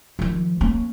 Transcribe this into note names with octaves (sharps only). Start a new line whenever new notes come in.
D#3 F3
A#3 C#4